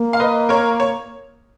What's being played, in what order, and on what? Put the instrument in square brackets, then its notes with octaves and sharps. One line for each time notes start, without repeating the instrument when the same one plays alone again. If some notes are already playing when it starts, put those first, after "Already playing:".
Already playing: [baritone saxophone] A#3
[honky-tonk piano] F5
B4 D#5
A#4 C#5
C#5